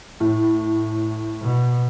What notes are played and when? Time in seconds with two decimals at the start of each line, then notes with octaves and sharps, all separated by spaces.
0.20 A2
1.43 B2